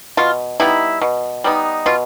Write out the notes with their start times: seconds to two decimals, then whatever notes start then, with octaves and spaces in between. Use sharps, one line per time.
0.17 B2 F4
0.60 G3 B3 D#4 E4
1.01 B2
1.44 G3 B3 D#4
1.86 B2 F4